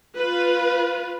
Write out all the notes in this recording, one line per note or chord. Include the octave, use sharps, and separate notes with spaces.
F4 B4